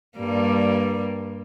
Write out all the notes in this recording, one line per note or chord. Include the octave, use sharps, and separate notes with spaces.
G2 G3 A#3